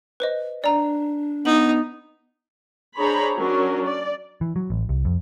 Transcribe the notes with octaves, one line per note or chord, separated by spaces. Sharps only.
B4 C5 D#5
D4 D5 A#5
B3 D#4 F#7
D4 G#4 C5 C#5 A#5 B5
F#3 C#4 D4 F#4 A#4
D5
E3
F#3
A1
C2
F2